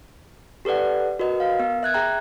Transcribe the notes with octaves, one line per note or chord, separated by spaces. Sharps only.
G4 A4 B4 D5 F#5
F#4 A#4 B4 D#5
F5
B3 A#4
E5 F#6 G#6
G#4 E5 G5 A#5